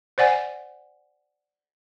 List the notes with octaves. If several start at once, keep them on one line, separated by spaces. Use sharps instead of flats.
C5 D5 F#5 G#5